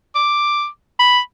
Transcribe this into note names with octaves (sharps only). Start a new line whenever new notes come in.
D6
B5